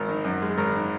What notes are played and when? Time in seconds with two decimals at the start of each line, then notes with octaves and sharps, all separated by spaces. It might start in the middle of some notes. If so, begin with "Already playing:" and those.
Already playing: G#1 A#4
0.08 D#3
0.25 F#2
0.42 G#3
0.58 G#1 A#4
0.74 D#3